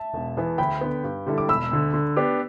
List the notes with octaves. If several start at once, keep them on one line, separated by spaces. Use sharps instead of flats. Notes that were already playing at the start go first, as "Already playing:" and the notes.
Already playing: E5 A5
E1
E2 E3 B3
D2 G5 B5
D3 B3
G2
D3 G3 E4 A4
D6
E1 B5 E6
D2 D3
D3
B3 D4 G4